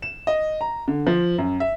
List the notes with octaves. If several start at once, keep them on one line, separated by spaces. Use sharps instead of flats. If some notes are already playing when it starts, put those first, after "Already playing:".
E7
D#5
A#5
D3
F3
F#2
E5